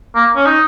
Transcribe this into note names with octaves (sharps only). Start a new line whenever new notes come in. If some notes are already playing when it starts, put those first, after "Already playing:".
A#3
C#4
D#4